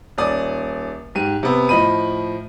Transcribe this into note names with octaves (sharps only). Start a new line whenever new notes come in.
D#1 C#4 D5 D#6
G#2 G4 D#7
C3 B3
A2 F3 D#5 B5 D#7